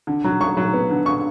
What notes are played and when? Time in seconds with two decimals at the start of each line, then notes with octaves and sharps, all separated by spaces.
0.07 D3
0.24 F#3
0.40 F#3 C#6
0.57 F#3
0.74 B3
0.90 D3
1.06 D3 C#6